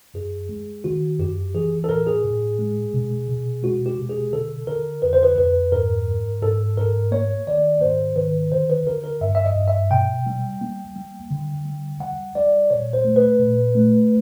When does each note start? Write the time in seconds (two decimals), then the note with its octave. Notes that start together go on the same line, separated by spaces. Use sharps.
0.14 F#2 G#4
0.49 G#3
0.84 D#3 F#4
1.19 F#2 G4
1.55 E3 G#4
1.84 A4
1.89 A2 A#4
2.07 G#4
2.24 A2
2.59 G#3
2.94 B2
3.28 B2
3.63 G#3 F#4
3.86 G4
3.99 B2
4.09 G#4
4.33 D3 A4
4.67 D3 A#4
5.02 F2 B4
5.13 C5
5.23 B4
5.38 F2 B4
5.72 G#2 A#4
6.07 G#2
6.42 G#2 A4
6.77 G#2 A#4
7.11 A#3 C#5
7.47 D#3 D5
7.81 G#2 C5
8.16 D#3 B4
8.52 D3 C5
8.70 B4
8.86 D3 A#4
9.04 A#4
9.21 G2 E5
9.35 E5
9.45 D#5
9.56 G2
9.68 E5
9.91 B2 G5
10.27 G3
10.61 A#3
10.96 G3
11.30 D3
11.65 G3
12.00 G3 F#5
12.35 G3 D5
12.70 A#2 C#5
12.93 C5
13.05 A3
13.16 B4
13.39 A#2
13.75 A3